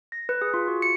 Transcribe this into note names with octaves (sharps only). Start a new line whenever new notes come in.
A#6
B4
G#4
F4
F#4
C#7